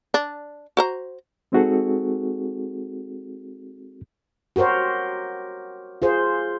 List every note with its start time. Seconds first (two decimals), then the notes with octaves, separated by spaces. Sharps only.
0.14 D4
0.77 F#4 C5 A#5
1.52 G#3 C4 D#4 F#4 G#4 A4
4.56 F#4 G4 A#4 C5 C#5
6.02 F4 G#4 C5